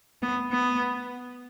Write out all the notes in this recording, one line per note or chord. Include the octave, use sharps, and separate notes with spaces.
B3
B3